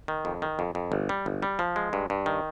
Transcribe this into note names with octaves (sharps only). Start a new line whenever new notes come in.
D#3
F2
D#3
F2
F2
G1
G3
G1
G3
F3
G#3
G2
G2
D#3